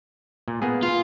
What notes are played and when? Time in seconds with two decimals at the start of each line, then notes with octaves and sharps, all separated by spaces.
0.48 A#2
0.62 A#3 B3 G#4
0.83 F4